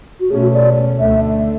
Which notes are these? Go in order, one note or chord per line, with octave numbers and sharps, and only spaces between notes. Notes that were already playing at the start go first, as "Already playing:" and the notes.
F#4
B2 A3 C#4 G#4
F#4
D5
D2 D3 A3 E5